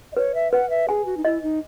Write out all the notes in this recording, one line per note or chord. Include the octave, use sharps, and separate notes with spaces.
D#5
B4 C#5
E5
B4 F#5
E5
G#4 G#5
F#4
D#4
E4 D#5
D#4